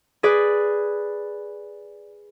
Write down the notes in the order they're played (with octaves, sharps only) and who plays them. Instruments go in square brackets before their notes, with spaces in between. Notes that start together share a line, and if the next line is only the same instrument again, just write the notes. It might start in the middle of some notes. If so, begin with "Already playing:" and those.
[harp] G#4 B4 D5